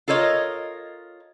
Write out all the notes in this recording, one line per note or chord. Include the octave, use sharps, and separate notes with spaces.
F4 A4 A#4 C#5 D#5